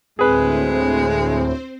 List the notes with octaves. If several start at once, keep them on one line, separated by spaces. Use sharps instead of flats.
D2 A2 G#3 C4 G#4 B4 C5